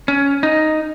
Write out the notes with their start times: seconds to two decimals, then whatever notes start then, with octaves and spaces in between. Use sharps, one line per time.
0.08 C#4
0.43 D#4